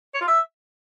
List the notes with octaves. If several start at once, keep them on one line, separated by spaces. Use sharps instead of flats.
C#5
F4
E5